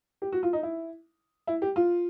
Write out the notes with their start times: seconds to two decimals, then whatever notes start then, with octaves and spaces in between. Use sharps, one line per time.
0.22 G4
0.32 F#4
0.43 F4
0.53 D#4
0.63 E4
1.47 E4
1.62 G4
1.76 F4